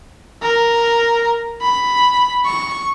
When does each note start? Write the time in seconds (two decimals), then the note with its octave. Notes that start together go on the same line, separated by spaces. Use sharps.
0.42 A#4
1.62 B5
2.45 C#6